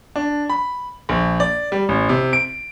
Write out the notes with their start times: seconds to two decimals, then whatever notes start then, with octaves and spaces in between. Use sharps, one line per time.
0.16 D4
0.49 B5
1.09 A#1
1.40 D5
1.72 G3
1.89 A1
2.09 C3
2.33 D7